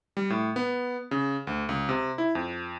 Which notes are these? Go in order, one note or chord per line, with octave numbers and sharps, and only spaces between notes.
G3
A2
B3
C#3
D2
C#2
C3
E4
F2